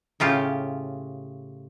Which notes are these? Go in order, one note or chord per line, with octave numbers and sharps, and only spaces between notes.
A2 C#3 F4 G4